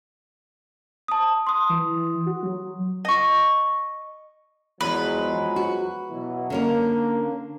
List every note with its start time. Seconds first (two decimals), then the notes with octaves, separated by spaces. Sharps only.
1.08 A5 D#6
1.47 C6 D#6
1.69 E3
2.26 F#4
2.43 F#3
3.05 D#5 C#6
4.81 E2 F3 F#3 G#3 B4
5.56 F#4
6.10 B2 E3 F#3
6.50 D3 A#3 C#4 A#4